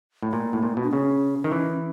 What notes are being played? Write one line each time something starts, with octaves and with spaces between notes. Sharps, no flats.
A2
A#2 A#3
A2
A#2
B2
D4
C#3 C#4
D#3
E3